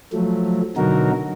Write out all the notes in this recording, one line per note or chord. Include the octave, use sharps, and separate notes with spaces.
F3 F#3 A3
B2 D3 F#3 D#4 F#4 A#4